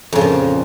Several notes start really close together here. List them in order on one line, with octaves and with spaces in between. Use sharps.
F2 C#3 F3 A#2